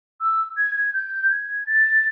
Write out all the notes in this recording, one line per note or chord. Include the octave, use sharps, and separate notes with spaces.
E6
G#6
G#6
G6
G#6
A6